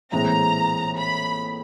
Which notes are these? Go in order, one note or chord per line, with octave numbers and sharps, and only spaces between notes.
A#1 A2 E3 G#3 C4 A#5
B5